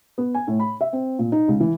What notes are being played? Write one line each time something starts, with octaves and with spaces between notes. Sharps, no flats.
B3
G#5
A2
B5
E5
C4
A#2
D#4
C#2
E3